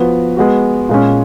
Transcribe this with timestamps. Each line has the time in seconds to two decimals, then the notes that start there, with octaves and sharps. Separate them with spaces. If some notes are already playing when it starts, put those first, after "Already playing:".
Already playing: F3 B3 F#4
0.37 G#3 B3 F#4
0.89 A#2 G#3 C#4